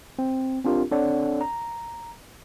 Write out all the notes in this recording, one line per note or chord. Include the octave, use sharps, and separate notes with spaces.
C4
C4 D4 F4 G4 A#4
C4 D4 A4 C#5 D5 F#5
A#5